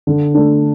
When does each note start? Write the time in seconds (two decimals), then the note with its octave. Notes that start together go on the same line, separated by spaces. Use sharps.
0.07 D3
0.34 A3 D4